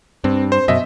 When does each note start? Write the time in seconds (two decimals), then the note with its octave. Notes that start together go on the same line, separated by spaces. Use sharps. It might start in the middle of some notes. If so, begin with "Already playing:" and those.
0.24 G2 C4
0.52 C5
0.68 F#2 B2 D#5 E5